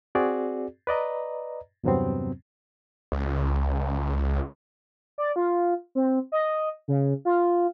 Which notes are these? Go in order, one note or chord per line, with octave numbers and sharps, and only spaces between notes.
C4 F#4 G#4 D5
B4 D5 D#5 A#5
E2 G2 C3 F#3 B3 C4
C#2
D5
F4
C4
D#5
C#3
F4